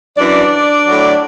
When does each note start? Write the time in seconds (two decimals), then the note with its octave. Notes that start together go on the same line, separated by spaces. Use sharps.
0.18 F#2 E3 D4 D5
0.87 A2 F#3